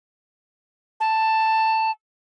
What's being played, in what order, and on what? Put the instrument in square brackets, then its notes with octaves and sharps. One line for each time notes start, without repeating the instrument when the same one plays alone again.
[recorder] A5